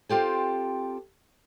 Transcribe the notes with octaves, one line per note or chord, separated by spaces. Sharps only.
C4 F4 G4 A4